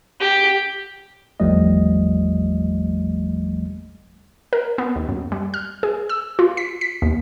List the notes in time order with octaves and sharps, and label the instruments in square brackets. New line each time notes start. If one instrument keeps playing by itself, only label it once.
[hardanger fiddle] G4
[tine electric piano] G#1 E2 F3 G3 A3 D#5
[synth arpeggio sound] A#4
B3
D#2
F#2
G3
F6
G#4
E6
F4
B6
B6
D#2